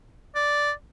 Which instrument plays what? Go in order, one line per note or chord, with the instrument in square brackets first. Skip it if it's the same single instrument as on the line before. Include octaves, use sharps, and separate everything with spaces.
[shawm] D5